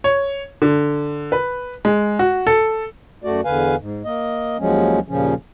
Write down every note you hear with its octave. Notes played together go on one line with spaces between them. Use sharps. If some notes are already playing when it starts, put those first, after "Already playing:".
C#5
D3
B4
G#3
F#4
A4
F#2 A3 F#4 D5
E2 D3 B4 F5 G#5
G#2
A#3 D#5
D#2 F3 F#3 G#3 C#4
D#2 A#2 C#3 F3 C#4